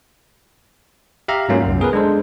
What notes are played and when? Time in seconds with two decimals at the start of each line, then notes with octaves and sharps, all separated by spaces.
1.28 G4 E5 F5 A#5
1.49 G#2 F#3 A3 A#3 C#4 F4
1.62 C2 F#2
1.80 B3 G#4 A#4 B4
1.93 G#3 D4 A4 C5